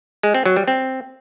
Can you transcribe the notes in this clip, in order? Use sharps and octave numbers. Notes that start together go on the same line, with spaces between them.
G#3
C4
F#3
G3
C4